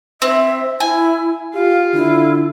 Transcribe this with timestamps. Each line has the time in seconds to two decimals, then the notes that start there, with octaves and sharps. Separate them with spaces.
0.22 C4 E5
0.80 E4 G#5
1.54 F4 G4 F5
1.94 D3 E4